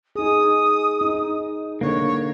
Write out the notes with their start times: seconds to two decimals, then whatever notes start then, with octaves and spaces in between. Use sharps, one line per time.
0.16 D#4 G#4 D#6
1.01 D#4
1.81 D3 A#3 C#5